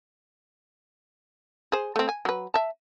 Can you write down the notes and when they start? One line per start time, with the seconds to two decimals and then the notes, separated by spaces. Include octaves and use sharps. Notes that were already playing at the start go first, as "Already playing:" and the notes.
1.72 G#4 C5
1.96 A3 C4
2.09 G#5
2.25 F#3 B4
2.54 E5 A5